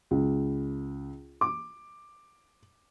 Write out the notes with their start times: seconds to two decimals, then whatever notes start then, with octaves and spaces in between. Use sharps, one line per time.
0.11 C#2
1.41 D6